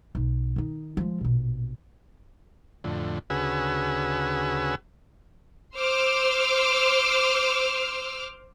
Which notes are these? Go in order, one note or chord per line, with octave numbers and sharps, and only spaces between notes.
B1 D#4
D#3 D#4
F3 G#3
A#1 B2
F2 A2 D3
D2 C#3 F#4 G#4 B4 E6
C5 C6 D6 E6 F6